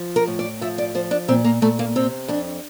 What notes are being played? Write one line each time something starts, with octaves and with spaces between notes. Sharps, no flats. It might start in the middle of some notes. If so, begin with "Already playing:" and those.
Already playing: F3
A#4
A2
D5
F3 E5
D5
F3 C5
D4
A#2 C4
A#3
A#2 A3
A#3
C3 C4
F2 D4